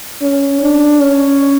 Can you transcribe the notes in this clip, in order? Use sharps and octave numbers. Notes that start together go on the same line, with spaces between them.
C#4
D4
C#4